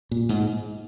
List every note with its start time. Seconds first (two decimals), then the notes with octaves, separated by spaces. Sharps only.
0.11 A#2
0.29 G#2